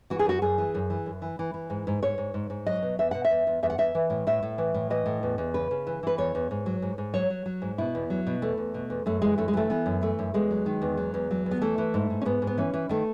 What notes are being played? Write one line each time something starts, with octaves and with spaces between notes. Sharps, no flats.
E3 F#4
G#4
F#2 F#4
F#2 G#4
E3
F#2
E3
F#2
E3
E3
E3
G#2
G#2
G#2 C#5
G#2
G#2
G#2
F#3 D#5
B2
E2 E5
B2 F#5
E5
E2
E2
E2 E5
F#5
E2 E5
E3
A2
A2 E5
A2
E3
A2
E3 D#5
A2
E2
E2
C#3 B4
C#3
E3
E3 B4
E2 C#5
E2
G#2
F#3
G#2
G#2
F#3 C#5
F#3
F#3
G#2
B2 E4
E2
F#3
B2
E2 A3
E2
B2
E2
F#2 A3
E3 G#3
F#2 A3
G#3
E3 A3
E3 B3
F#2
E3 A3
F#2
E2 G#3
F#3
D#3
E2
F#3
E2
F#3
E2
B3
E3 A3
E3
G#2
G#2
C#4
G#2 B3
G#2
B3
E3 C#4
E3
D#3 A3